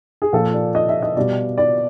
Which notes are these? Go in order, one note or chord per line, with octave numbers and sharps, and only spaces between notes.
G#4
A#2 F3 A4
D5
D#5
E5
D#5
B2 G3 D5
D5